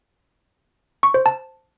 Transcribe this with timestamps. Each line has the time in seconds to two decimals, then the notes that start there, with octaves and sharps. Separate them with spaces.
1.03 C#6
1.14 C5
1.26 A5